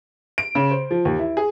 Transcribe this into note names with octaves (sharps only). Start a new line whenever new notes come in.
D7
C#3
C5
F3
D#2
E4
G#4